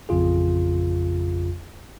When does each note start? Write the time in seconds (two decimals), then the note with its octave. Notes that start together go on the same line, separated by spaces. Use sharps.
0.09 A1 F2 C#3 F4 G#4